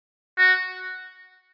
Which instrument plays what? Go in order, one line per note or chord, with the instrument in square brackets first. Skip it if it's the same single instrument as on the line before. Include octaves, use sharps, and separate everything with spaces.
[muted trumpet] F#4